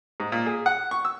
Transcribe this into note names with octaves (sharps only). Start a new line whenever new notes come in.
G#2
A#2
G#4
F#5
C#6
E6